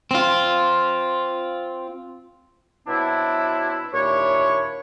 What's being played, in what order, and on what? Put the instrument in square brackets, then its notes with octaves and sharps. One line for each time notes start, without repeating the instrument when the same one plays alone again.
[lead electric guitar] C4 F4
[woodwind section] B2 F#3 C4 D4 E4
D#2 A#2 D4 E4 C#5